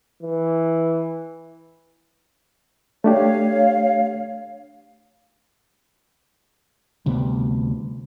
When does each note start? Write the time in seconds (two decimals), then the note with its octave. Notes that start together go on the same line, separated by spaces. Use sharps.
0.23 E3
3.04 A3 D4 G4 C#5 F5
7.06 D2 C3 G3 B3